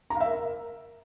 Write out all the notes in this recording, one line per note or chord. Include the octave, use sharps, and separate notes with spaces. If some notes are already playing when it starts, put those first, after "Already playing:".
A#5
F5
E5
A#4